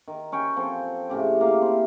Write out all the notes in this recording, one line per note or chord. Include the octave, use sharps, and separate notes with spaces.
D#3
C#4 C#5 G5
F3 C4 A4
A2 C#3 G4
A#3 F5
C4 E4